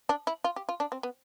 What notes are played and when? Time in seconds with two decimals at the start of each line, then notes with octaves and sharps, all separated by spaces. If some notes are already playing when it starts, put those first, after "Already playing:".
0.09 D4
0.27 E4
0.44 F4
0.56 G4
0.69 F4
0.80 D4
0.92 C4
1.03 B3